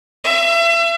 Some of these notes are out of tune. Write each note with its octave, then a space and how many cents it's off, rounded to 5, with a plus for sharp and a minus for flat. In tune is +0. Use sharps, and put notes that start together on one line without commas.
E5 +35